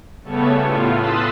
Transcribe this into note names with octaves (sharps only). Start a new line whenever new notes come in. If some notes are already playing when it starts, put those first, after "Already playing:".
C#3 G3 A3 B3 A4 C#5
A2 F4
C6 D#6 E6 F#6 A6 B6